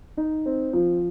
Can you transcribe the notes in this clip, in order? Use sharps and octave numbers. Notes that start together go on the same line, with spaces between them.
D#4
C4
F3